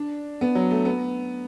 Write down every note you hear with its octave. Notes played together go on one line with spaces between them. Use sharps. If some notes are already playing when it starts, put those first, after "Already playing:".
Already playing: D4
B3
F#3
A3
B3